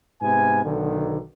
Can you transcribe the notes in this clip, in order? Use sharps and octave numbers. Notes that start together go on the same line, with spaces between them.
G#2 C3 B3 G#5
B1 D3 D#3